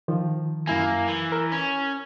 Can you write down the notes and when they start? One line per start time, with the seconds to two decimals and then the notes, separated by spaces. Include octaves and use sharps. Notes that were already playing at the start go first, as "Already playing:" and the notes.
0.08 D#3 F3
0.67 F#2 A#3 E4 G#5
1.08 E3
1.32 A#4
1.52 C#4